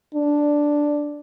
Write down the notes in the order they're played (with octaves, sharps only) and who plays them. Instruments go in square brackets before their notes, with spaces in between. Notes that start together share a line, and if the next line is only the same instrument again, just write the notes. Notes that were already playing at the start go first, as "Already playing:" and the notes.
[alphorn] D4